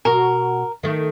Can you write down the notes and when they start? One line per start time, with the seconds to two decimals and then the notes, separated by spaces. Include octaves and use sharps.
0.05 B2 F#4 A#4
0.83 D#3 A3